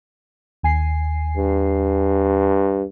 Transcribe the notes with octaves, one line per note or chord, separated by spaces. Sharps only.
D#2 G#5 C7
G2